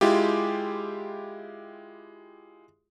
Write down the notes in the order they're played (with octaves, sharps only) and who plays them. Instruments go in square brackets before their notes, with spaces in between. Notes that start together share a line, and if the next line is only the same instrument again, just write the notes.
[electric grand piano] G#3 E4 F4 G4